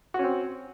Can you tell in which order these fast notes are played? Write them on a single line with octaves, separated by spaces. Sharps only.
F#4 C#4 C4